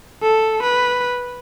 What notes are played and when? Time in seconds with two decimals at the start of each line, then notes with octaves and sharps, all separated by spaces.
0.23 A4
0.62 B4